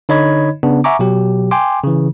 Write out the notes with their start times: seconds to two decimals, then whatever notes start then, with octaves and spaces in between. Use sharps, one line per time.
0.09 D3 D#4 C#5 D#5 B5 G#6
0.63 C#3 B3 D4
0.84 E5 F#5 G#5 A#5 C#6 D6
0.99 B2 F#3 G4
1.51 G5 G#5 C6 D6
1.84 C#3 E3